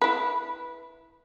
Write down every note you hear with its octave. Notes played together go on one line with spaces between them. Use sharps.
E4 B4